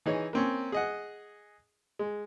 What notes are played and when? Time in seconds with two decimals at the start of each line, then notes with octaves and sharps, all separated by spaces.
0.06 E3 D#4 G#4 C#5
0.33 A#3 C4 C#4
0.72 G#4 D#5 F#5
1.99 G#3